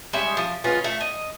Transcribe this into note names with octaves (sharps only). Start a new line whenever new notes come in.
G3 G#3 C#4 E5
F3
G#3 B3 C#4 F4
A3
D#5